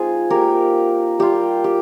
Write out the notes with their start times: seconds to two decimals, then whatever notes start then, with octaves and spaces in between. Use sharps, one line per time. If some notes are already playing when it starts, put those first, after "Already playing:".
Already playing: G#3 C4 D#4 F4 G#4
0.30 A#3 D#4 G4 A#4
1.19 G3 A#3 F4 G4
1.64 G4